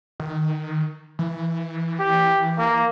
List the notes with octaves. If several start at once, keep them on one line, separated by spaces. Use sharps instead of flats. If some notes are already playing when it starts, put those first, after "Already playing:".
D#3
E3
G4
A#3